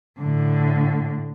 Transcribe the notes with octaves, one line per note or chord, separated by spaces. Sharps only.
A2 D3